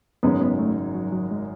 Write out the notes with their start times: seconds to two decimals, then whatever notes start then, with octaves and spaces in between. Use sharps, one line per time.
0.23 G#1 F#2 C#3 G#3 B3 D#4
0.41 B3
0.59 A3
0.94 F#3
1.13 F#3
1.31 G#3